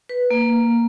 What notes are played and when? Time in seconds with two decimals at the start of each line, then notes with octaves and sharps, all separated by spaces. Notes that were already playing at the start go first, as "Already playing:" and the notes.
0.09 B4
0.31 A#3